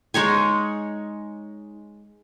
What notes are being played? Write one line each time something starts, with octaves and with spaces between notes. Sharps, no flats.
G#3 D#4 C#5 G#5